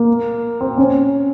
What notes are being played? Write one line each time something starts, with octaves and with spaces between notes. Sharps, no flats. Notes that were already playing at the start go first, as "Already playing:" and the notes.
Already playing: A#3
C4
C#4